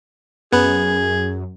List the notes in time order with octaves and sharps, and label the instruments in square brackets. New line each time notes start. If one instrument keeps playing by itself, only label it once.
[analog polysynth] F#2 [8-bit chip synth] B3 B4 [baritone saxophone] G#4